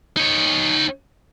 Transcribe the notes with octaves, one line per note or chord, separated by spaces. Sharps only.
D#4 C#5